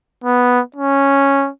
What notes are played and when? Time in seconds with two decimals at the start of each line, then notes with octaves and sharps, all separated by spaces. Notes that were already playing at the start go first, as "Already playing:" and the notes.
0.24 B3
0.76 C#4